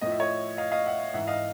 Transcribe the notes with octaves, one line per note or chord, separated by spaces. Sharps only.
A2 F3 D#5
E5
C#5 D#5
D#5 F5
D#5 F5
E5 F#5
G#2 E3 E5 F#5
D#5 F5